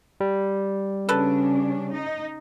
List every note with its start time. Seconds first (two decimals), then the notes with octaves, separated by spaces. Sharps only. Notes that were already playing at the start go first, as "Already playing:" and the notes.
0.20 G3
1.09 C#3 C#4 D4 A4 B4
1.93 D#4